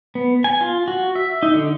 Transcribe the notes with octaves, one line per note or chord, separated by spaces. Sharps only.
B3
G#5
F4
F#4
E5
D#4
D3